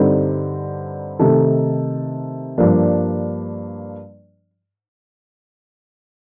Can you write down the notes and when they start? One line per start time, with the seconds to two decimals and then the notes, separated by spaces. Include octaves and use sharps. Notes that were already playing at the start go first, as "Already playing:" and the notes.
Already playing: G2 D3 G3 C4 D#4
1.19 C3 D#3 A3 D#4 A4
2.58 G2 F3 A#3 D4